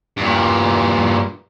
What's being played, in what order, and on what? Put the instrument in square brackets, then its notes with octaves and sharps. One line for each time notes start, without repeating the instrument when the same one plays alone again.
[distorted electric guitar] G2 A#2